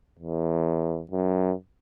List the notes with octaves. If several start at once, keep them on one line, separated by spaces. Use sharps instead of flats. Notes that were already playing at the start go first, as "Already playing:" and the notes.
E2
F#2